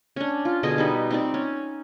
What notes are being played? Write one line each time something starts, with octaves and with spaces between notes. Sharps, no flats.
C#4 D4
F4
B2 D3 G#4 D#5
G3 D#4 B4
C4 D#4 D5
C#4